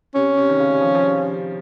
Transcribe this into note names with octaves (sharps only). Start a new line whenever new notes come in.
C3 C#4
C3
D#3
C#3
G3
F3
F3
G3